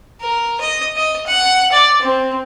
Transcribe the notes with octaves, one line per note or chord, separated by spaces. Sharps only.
A#4
D#5
D#5
F#5
D5
C4